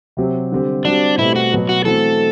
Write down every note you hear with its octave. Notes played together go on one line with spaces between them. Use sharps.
C3 F#3 C4 G4
D3 G3 C4 G4
G3 C4 D4 F#4
B2 A3 C4 E4 G4
F#4
B2 F#3 B3
F#4
E3 A3 C4 F#4 A4